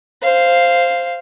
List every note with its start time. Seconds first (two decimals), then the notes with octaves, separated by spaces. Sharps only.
0.22 C5 F5